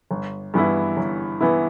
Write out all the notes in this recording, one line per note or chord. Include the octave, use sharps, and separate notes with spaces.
G1
G2 E3 B3 E4
G1
E3 B3 E4